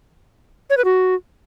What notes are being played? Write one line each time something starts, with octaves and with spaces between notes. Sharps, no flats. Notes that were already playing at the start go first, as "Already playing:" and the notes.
C#5
B4
F#4